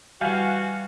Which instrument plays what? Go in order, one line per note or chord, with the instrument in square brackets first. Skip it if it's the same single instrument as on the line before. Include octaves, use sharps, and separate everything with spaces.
[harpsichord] E3 G3 [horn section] F#4 [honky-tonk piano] F5 G#5 G6